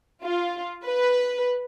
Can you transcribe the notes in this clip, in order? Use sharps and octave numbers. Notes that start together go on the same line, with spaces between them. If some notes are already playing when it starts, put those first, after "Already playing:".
F4
B4